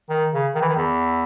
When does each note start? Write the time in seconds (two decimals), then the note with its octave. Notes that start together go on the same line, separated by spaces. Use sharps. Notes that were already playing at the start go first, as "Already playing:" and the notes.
0.09 D#3
0.32 C#3
0.54 D#3
0.61 E3
0.69 D#3
0.76 E2